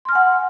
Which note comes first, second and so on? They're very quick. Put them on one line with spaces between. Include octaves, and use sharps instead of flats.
C6 F6 G#5 F#5